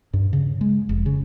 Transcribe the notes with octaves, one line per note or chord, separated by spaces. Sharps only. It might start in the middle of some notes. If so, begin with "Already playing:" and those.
G2
C#3
G#3
F1
C#3